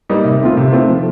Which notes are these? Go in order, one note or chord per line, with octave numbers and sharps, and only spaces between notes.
G3 A#3 D#4
C3
D#3 A3 C4 F4
C3
D#3 A3 C4 F4
F3